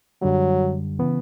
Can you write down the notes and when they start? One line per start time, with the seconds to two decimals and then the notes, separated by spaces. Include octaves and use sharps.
0.22 F#2 D3 F#3 G3
0.99 C#3 E3 B3